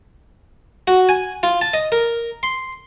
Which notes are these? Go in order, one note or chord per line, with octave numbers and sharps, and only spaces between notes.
F#4
G#5
F4
A5
D#5
A#4
C6